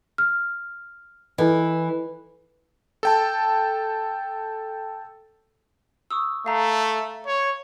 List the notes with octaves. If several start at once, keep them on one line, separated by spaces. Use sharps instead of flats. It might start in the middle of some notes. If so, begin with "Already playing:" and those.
F6
E3 E4 A4 D#5
A4 G5 A5
C#6 D#6 E6
A3 F5 A#5
C#5